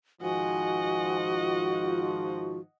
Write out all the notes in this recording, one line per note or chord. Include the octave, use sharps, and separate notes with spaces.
G#2 D#3 F3 F#4 D#5 F#5 G#5
F4